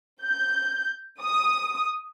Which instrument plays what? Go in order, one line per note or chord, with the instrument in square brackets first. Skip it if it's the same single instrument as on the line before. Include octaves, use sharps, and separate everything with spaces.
[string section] G6
D#6